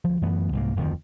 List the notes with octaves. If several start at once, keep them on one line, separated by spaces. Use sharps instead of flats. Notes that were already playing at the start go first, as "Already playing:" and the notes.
D2 F3
F#2 E3 A3 B3
C2 G#2 A#3
D1 F2 D#3 F3